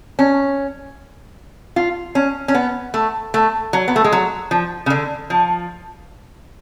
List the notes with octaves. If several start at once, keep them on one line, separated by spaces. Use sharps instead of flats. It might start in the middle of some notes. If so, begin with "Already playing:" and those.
C#4
F4
C#4
C#4
B3
A3
A3
F#3
B3
A3
G#3
F#3
F3
C#3
D3
F3